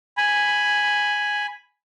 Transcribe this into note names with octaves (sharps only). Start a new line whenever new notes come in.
G#5 B5